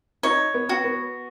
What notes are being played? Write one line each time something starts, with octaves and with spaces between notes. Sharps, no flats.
D#4 C#5
B3
F#4
B3